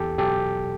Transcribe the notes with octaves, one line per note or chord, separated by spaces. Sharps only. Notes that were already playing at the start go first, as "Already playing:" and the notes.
Already playing: E2 G4 A4
B2 F#3 G4 A4